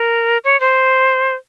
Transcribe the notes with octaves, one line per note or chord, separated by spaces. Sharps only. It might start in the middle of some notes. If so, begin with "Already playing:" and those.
Already playing: A#4
C#5
C5